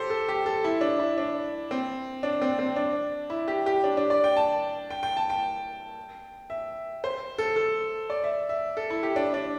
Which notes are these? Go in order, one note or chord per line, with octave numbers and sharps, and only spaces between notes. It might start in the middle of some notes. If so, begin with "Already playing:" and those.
Already playing: G4 A4 C5
A4
G4
A4
E4
D4
E4
D4
C4
D4
C4
C4
D4
E4
G4
G4
D4
D4
D5
G5
A5
G5
G5
A5
G5
E5
C5
A4
A4
D5
E5
E5
A4
E4
G4
D4
D4